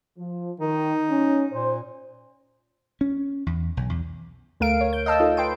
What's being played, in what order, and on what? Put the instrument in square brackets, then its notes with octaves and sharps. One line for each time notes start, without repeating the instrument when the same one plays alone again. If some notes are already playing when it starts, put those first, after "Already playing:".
[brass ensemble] F3
[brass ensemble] D#3 [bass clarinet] D#4
[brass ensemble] C#4
[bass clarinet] A#2 [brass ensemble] C5
[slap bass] C#4
E2
B1
E2
[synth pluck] D2 A3 A#4 F5 D7
C#5
G6
D#5 F5 A5 E6
D#4 F4 A4
B4 G5 C6 D7